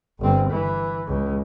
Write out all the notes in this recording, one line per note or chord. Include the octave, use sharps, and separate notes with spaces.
G1 C4
E3
C#2